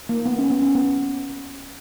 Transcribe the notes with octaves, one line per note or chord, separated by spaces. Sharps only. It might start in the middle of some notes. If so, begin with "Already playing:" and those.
A#3
B3
C#4
B3
C#4
B3